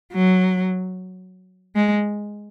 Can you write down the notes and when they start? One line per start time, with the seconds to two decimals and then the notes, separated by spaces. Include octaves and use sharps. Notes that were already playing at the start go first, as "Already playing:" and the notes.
0.13 F#3
1.76 G#3